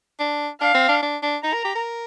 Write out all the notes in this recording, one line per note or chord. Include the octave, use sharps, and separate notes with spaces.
D4
D4 F5
C4
D4
D4
D4
D#4 A#5
A#4
G4
A#4